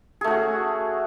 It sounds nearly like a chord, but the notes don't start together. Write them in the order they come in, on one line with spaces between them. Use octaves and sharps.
G#4 A3 F#4 C#4